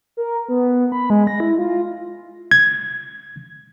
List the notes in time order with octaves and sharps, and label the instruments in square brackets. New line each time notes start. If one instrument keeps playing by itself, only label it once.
[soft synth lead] A#4
B3
B5
G#3
A#6
E4
F4
[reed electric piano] G#6